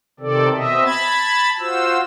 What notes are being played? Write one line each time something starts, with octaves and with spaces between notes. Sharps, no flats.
C3 D#3 C4 A4 D5
B2 C4 D#5 E5
A5 B5 G#6 A6
F4 F#4 C5 E6